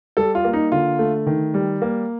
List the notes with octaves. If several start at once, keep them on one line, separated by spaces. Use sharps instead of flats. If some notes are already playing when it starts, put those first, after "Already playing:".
G3 A4
F4
A#3
D#4
D3 F4
A3
D#3
G3
A#3